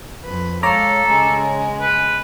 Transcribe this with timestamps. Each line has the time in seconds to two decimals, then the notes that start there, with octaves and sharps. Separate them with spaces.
0.25 F2 B4
0.63 G#3 A4 C#5 F5 A#5 D6
1.05 C#3 G#3
1.81 B4